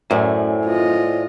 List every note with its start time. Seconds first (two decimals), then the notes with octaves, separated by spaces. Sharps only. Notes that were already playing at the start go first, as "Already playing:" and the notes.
0.11 F#2 A2 C5 D5 G#5
0.66 F4 D#5